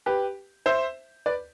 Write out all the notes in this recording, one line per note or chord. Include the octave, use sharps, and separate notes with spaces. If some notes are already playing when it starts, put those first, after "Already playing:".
G4 B4
C5 E5
B4 D5